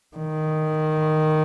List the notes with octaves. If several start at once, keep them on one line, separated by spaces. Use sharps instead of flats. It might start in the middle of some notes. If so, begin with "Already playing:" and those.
D#3